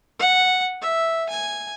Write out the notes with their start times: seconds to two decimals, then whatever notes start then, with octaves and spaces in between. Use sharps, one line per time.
0.19 F#5
0.81 E5
1.29 G#5